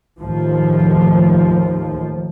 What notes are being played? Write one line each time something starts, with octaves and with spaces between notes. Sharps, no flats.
D#2 A2 F3